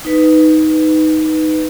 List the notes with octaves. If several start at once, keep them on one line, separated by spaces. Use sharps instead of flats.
D#4 B4